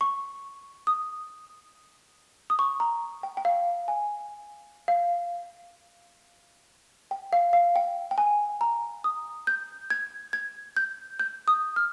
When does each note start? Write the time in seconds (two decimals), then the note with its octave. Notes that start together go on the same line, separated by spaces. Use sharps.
0.01 C#6
0.87 D#6
2.50 D#6
2.59 C#6
2.80 A#5
3.23 G5
3.37 G5
3.45 F5
3.88 G#5
4.88 F5
7.11 G5
7.33 F5
7.53 F5
7.76 G5
8.11 G5
8.18 G#5
8.61 A#5
9.04 D#6
9.47 G6
9.90 G#6
10.33 G#6
10.77 G6
11.19 G6
11.48 D#6
11.76 F6